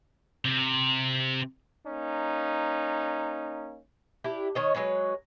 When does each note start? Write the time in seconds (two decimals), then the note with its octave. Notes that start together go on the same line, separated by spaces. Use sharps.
0.45 C3
1.87 A#3 C#4 D#4
4.24 D4 E4 G4
4.55 D#3 C#5 D#5
4.75 F#3 G#3 B4 C#5